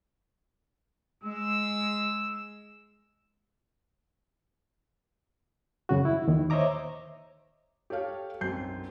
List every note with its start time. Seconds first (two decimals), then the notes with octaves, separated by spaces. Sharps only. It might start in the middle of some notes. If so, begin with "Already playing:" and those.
1.24 G#3 E6
5.89 F#2 C#3 F#4
6.05 E4
6.28 D#2 D#3
6.50 C5 C#5 D#5 E5 A#5 D6
7.90 G4 A4 C#5 F5 G5
8.41 B1 F#2 C4 G6 C7